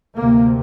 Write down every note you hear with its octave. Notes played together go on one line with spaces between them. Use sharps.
D2 C3 A#3